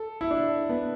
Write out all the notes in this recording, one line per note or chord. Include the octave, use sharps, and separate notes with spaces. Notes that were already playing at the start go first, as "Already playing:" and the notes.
Already playing: A4
E4
D4
B3